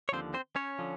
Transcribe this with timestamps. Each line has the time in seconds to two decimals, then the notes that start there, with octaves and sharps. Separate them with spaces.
0.09 C#5
0.12 D#2 D3 F3 C4 C5
0.34 C4 C5
0.56 C#4 C#5
0.79 D3 F3